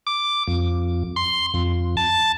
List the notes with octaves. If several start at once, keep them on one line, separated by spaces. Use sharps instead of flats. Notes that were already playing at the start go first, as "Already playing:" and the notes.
D6
F2
C6
F2
A5